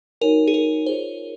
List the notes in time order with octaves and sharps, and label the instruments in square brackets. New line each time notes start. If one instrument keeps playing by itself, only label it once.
[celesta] D#4 F#4 C#5 G#5 [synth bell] A#4
[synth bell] G#4
A#4
[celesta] F4 G#4 C#5 [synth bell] C5